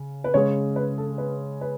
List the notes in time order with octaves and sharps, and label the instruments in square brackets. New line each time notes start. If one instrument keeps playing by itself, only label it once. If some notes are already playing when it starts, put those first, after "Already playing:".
Already playing: [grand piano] C#3
[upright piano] B4
[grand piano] C#3 G#3 C#4 G#4 [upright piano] C#5
[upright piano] B4
A4
B4
B4